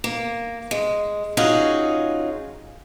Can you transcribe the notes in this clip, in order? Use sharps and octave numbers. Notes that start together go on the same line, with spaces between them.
A#3
G#3
C#4 D#4 F4 F#4 G#4